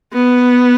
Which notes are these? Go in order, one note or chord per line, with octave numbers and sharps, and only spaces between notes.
B3